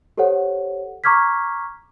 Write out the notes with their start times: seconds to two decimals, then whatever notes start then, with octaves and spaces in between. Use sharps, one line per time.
0.18 G4 A4 C5 C#5 F#5
1.04 A#5 C#6 D6 F6 G#6 B6